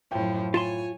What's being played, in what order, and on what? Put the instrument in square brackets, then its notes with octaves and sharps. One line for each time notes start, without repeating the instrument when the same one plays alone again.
[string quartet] F#2 F3 [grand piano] A2 G5
[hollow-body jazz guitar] F4 A5 C6 [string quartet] C#5 G#5